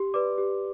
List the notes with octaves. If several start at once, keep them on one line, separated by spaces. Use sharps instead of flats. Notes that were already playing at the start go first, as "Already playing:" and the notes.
Already playing: G4 C6
B4 D5 D6
G4